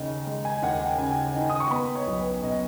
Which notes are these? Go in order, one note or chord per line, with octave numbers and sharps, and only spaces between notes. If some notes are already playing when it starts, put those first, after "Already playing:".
Already playing: D#2 C#3 D#4
G#3
G#5
D#2 F#5
F#5
C#3 G#5
D#4
D#6
C#6
B3 B5
C#5
B1
B4
B2 D#5